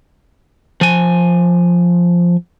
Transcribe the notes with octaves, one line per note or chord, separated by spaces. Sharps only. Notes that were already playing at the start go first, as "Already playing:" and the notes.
F3 G#5